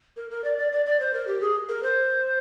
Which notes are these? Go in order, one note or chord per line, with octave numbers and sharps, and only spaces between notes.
A#4
A#4
D5
D5
D5
D5
C5
A#4
G4
G#4
A#4
C5